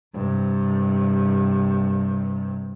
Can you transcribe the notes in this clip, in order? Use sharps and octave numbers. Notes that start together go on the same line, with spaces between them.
G2 C3